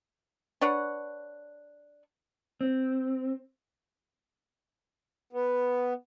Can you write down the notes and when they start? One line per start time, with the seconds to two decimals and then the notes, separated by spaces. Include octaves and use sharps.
0.61 D4 B4 C#5 F#5
2.61 C4
5.33 B3